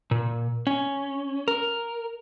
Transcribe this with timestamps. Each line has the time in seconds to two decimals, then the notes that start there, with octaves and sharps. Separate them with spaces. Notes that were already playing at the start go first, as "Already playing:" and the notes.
0.11 A#2
0.67 C#4
1.48 A#4